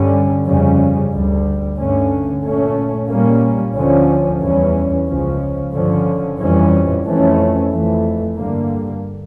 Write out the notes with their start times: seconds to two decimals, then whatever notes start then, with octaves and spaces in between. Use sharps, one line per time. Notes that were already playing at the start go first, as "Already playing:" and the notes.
Already playing: G2 D3 G3 C#4
0.45 F2 C#3 G3 C#4
1.11 D2 D3 G3
1.78 G2 D3 A3 C#4
2.43 A#2 A3 C#4
3.09 A#2 G3 A#3 C#4
3.75 D2 D3 F3 C#4
4.41 E2 E3 G3 C#4
5.07 C#2 C#3 F3 C#4
5.73 G2 D3 F3 C#4
6.39 F2 E3 G3 C#4
7.04 F2 E3 A3 C#4
7.71 F2 E3 A3
8.37 G2 D3 G3 A#3